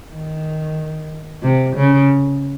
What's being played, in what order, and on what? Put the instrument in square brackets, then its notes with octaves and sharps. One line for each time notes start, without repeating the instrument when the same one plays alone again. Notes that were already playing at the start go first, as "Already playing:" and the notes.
[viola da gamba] D#3
C3
C#3